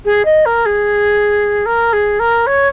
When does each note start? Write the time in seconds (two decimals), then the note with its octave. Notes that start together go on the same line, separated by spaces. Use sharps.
0.05 G#4
0.25 D#5
0.45 A#4
0.65 G#4
1.65 A#4
1.93 G#4
2.19 A#4
2.46 C#5